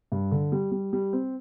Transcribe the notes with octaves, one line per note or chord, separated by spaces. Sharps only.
G2
D3
G3
G3
G3
C4